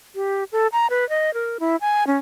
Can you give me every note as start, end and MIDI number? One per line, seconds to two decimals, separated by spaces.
0.15 0.44 67
0.52 0.67 69
0.72 0.87 82
0.90 1.08 71
1.09 1.33 75
1.34 1.58 70
1.60 1.76 64
1.81 2.06 80
2.07 2.17 61